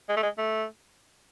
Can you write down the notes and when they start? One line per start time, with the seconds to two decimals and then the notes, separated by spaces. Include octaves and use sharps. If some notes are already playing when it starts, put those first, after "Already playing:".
0.09 G#3
0.16 A3
0.23 G#3
0.38 A3